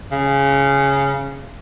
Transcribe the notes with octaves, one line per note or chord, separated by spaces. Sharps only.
C#3